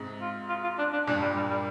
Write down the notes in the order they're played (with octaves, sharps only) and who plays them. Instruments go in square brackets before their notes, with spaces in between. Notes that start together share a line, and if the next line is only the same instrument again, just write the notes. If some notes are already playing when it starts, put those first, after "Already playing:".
Already playing: [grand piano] G#2 C3
[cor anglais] F4
F4
F4
D4
D4
[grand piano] G2 A#2 [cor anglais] D4
[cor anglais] G3
G3
G3